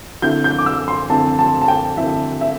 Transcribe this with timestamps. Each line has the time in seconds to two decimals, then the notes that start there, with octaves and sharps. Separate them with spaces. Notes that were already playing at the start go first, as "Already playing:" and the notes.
0.22 D3 C4 E4 G6
0.44 G6
0.58 D6
0.66 E6
0.88 C6
1.10 D3 C4 E4 A5
1.39 A5
1.62 A5
1.68 G5
1.97 D3 C4 E4 E5
2.41 E5